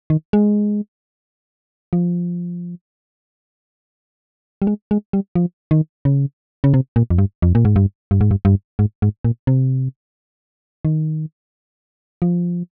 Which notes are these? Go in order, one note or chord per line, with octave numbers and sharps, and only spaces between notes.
D#3
G#3
F3
G3
G#3
G#3
G3
F3
D#3
C#3
C#3
C3
A#2
F2
G2
F2
A#2
G#2
G2
G2
G#2
G2
G2
G#2
G#2
A#2
C3
D#3
F3